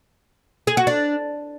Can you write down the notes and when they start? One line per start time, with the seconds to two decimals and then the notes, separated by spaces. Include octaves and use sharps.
0.67 G#4
0.77 F#4
0.87 D4